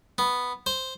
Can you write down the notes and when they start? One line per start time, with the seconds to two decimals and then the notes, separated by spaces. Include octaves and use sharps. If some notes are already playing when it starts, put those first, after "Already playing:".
0.18 B3
0.66 C5